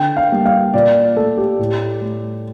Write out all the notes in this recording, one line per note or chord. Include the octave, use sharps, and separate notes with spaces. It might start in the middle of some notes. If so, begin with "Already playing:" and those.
Already playing: D3 G5
F5
G3 A#3
F5
A#2 D5
A3 A4
G4
A2
A3